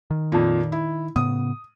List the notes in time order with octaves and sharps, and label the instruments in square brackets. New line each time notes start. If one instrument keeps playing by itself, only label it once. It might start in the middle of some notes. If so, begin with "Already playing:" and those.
[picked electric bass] D#3
[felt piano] F2 A#2
E4
[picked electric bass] A2 C#3 B3 [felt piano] D#6